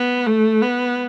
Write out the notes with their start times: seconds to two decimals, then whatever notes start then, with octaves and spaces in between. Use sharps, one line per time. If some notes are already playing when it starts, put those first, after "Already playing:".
Already playing: B3
0.27 A3
0.62 B3